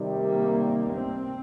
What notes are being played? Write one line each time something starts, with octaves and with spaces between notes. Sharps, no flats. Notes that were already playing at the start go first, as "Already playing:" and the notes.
Already playing: C3 D#3 G3
A#3
C4